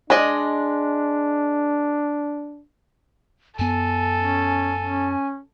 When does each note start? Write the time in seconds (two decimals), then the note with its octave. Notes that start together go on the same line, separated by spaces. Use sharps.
0.10 G#3 D4 D5 D#5
3.59 F#2 B3 A4 G#5
4.18 C#4
4.81 C#4